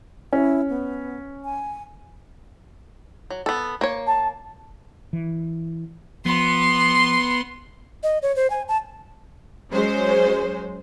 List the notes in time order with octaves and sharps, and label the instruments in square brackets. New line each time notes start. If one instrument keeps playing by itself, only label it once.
[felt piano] C#4 [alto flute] E4
[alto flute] B3
G#5
[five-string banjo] F#3
B3 A4
A#3 C#5
[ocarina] A5
[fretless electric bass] E3
[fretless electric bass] F3 [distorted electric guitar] B3 [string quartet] C6
[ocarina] D#5
C#5
C5
G#5
A5
[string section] F#3 G#3 C#4 C5